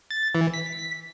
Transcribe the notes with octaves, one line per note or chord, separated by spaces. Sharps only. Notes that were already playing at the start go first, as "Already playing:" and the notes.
A6
E3
B6